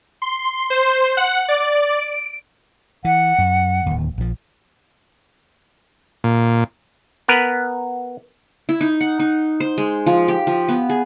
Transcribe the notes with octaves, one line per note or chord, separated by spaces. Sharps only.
C6
C5
F#5
D5
D7
E3 F#5
F#2
D1 D#2
A#1 F3
A#2
B3 A#4 B4
E4
D#4
F#5
D#4
C5
G#3
F3
G4
F3
B3
G#4